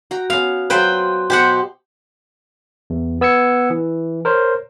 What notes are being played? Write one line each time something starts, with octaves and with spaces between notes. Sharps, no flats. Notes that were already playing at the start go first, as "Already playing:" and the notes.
F#4 G5 A#5
B3 C#4 F5
F#3 F4 B4 C5 G5
B2 B3 G4 C5 F#5
E2
B3 E6 G#6 C#7
E3
A#4 C5 C#5